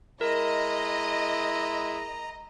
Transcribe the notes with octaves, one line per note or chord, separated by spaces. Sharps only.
G#3 E4 A#4 D#5 A#5